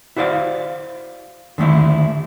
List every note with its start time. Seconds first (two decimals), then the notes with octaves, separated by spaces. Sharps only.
0.16 E4 F#4 C5 D5 F5
1.58 D3 D#3 A3 E4